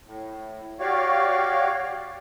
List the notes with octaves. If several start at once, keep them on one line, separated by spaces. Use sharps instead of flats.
A2
F#4 G4 C#5 D5 F5